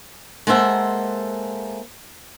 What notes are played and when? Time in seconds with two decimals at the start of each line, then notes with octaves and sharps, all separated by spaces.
0.47 G#3 A#3 A4 C5 E5 F#5